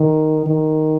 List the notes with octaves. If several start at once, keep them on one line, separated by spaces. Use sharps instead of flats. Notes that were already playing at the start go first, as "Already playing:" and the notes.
Already playing: D#3
D#3